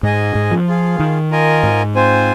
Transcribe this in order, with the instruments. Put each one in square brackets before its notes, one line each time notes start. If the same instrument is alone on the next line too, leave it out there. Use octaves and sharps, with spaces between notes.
[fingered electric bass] G#2 [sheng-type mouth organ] G#4 D#5 G#5
[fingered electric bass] G#2
F3
[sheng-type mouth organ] F4 G#4 F5
[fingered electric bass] D#3
[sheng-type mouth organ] F4 A#4 D#5 G#5
[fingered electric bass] G#2
[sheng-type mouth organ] C4 F4 C5 G#5